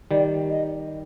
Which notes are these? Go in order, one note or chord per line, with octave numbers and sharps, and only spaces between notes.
D#3 G3 D5
D#5